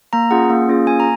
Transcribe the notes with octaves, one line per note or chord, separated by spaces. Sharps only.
A#3 A#5
C#4 F4 G#4 F#5
A#3
C#4 F4 G#4
A#3 G#5
A#5